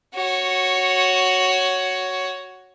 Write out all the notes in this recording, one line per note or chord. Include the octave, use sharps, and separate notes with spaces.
F#4 C#5